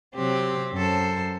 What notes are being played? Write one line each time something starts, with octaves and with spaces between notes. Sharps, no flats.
C3 F#3 C4 G4
F#2 A4 C5